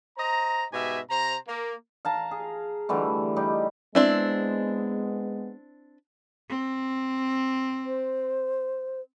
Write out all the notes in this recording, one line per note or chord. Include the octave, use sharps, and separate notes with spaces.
C5 D#5 A#5
G#2 B2 G4 E5 G#5
C3 C5 A#5
A#3
F5 A5 A#5
G#4
D3 E3 G3 A3
G3 D#4 G4
G#3 B3 C4 D4 E4
C4
C5